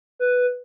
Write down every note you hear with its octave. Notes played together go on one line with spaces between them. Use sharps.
B4